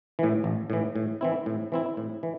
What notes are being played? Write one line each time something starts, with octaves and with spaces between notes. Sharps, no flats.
A2 E3
A1
A2 E3
A2
E3 C4 E4
A2
E3 C4 E4
A2
E3